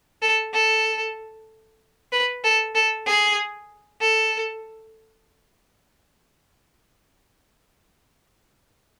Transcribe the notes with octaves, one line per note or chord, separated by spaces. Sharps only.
A4
A4
B4
A4
A4
G#4
A4